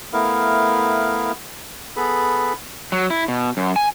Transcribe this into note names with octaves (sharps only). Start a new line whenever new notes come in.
A3 B3 E4 A#4 F5
B3 G#4 A4 B4 B5
F#3
E4
B2
F#2
G#5